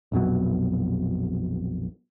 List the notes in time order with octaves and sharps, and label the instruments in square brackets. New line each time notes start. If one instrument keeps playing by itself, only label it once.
[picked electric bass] A#1 F2 B2 F#3